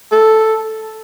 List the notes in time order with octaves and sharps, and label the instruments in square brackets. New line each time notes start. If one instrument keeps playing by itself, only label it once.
[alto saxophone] A4